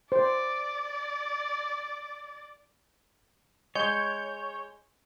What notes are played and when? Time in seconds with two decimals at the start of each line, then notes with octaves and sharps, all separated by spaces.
0.12 C5 D5
3.75 G#3 C#5 G6